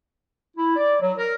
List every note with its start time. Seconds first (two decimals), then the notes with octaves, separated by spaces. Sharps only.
0.57 E4
0.76 D5
1.00 F#3
1.18 A#4